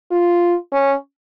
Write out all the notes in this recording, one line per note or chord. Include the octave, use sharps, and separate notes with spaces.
F4
C#4